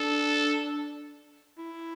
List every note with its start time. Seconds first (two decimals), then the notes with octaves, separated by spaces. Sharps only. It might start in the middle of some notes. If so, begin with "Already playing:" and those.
Already playing: D4 A4
1.58 E4